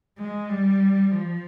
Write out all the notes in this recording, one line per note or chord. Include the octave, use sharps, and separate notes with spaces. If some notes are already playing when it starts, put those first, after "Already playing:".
G#3
G3
F3